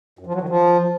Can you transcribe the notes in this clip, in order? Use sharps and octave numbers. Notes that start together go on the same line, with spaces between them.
F#2
F3
F#3
D#3
F3